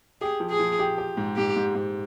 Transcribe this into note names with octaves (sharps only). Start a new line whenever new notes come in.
G4 G#4
F3
G#4
F3
G4
G4
G#2
G#2 G4
G#2
G#2